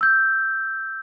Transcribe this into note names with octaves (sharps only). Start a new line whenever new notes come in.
E6 G6